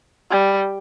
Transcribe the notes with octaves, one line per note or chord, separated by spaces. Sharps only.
G3